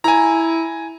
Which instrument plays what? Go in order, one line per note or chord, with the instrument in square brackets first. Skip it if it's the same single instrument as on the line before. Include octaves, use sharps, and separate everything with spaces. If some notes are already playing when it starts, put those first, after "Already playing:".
[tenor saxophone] E4 [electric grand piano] G#5 A#5